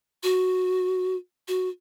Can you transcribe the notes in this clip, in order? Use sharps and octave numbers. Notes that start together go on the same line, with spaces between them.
F#4
F#4